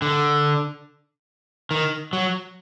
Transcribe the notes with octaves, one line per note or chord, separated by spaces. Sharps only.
D3
D#3
F#3